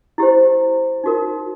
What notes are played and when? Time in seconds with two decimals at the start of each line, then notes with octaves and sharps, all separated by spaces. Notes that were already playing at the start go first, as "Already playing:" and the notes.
0.18 E4 G4 C5
1.04 D#4 F#4 A#4